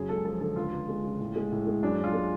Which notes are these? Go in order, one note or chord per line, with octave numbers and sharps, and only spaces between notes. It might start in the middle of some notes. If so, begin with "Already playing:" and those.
Already playing: F#2 C#3 G#4
G#3 A4
F3 A4
D3 A4
C#2 F4
C#2
G#3
C#3
A2
G#3
A2
G#3
F#2 D4
F#2
F4
G#3